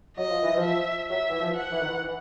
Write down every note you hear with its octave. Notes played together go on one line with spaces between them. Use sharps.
F#3 D#5
F3
E3
F3
E5
F#3 E5
E3
F3
F#5
E3
D#3
E3
E3